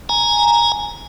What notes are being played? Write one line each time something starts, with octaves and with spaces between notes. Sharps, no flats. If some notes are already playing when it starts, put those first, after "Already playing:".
G#5 A#5